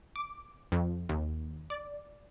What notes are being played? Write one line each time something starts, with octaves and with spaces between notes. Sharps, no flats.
D6
F2
D#2
D5